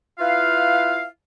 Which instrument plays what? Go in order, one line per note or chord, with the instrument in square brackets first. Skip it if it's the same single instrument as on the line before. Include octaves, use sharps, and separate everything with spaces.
[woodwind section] E4 F4 B4 F5